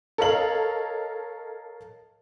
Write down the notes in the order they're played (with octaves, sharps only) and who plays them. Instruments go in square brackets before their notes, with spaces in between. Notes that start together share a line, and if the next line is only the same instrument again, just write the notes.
[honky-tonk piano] A4 A#4 C#5 D#5 F5 F#7